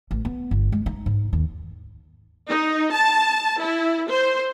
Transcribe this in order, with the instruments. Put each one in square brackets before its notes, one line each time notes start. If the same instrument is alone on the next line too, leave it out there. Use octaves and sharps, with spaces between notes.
[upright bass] A1
B3
G1
G#3
D#4
G#2
D#2
[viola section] D#4
A5
E4
C5